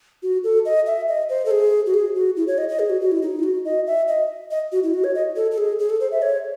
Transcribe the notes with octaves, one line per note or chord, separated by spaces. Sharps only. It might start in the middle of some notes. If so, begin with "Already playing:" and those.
F#4
A4
D#5
E5
D#5
C5
A4
G#4
F#4
G#4
F#4
E4
C#5
D#5
D#5
G#4
F#4
F#4
E4
D#4
E4
F#4
D#5
E5
D#5
D#5
F#4
E4
F#4
C#5
D#5
A4
A4
G#4
G#4
A4
C5
E5
C#5